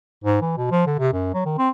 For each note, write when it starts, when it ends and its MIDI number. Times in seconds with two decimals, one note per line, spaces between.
0.24 0.40 44
0.42 0.56 52
0.58 0.68 47
0.71 0.86 53
0.87 0.96 50
0.99 1.12 48
1.13 1.32 42
1.34 1.43 54
1.46 1.55 51
1.58 1.70 60